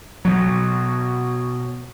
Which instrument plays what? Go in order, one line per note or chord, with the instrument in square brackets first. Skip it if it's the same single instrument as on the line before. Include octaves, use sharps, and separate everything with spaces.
[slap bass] B2 F#3